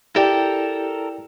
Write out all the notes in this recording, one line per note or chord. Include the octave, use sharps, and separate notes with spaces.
E4 G4 A4 A#4 D5 G5